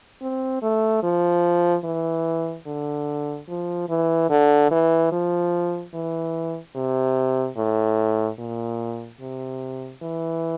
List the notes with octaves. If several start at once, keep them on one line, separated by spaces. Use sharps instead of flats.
C4
A3
F3
E3
D3
F3
E3
D3
E3
F3
E3
C3
A2
A#2
C3
E3